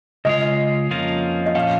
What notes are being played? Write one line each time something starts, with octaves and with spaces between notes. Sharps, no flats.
C#3 G#3 F4 D#5
F2 F3 A#3 C#4 F4
D#5
A#2 F3 C#4 F5